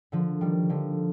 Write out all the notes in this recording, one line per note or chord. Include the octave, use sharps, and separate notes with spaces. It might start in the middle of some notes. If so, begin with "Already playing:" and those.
D3 F3
D#3 G3
D3 F3